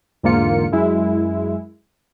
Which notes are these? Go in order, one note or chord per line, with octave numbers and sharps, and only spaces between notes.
E2 G#2 D3 A#3 F4 C#7
F#2 G#3 E4